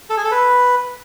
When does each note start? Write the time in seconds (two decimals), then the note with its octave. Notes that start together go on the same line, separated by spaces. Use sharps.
0.10 A4
0.17 G#4
0.24 A4
0.32 B4